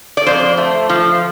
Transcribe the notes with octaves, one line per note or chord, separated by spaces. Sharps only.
D5
F2 C5
A3
F3